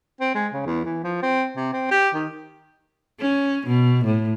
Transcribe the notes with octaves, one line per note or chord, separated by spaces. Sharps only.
C4
G#3
C#3
E2
E3
F3
C4
C3
C4
G4
D#3
C#4
B2
A2